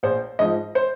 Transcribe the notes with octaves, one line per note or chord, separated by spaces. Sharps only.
A#1 C5
G#2 F3 D#5
C5